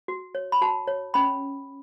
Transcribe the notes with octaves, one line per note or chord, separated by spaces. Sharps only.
F#4
C#5
B5
F#4 A5
C#5
C#4 B5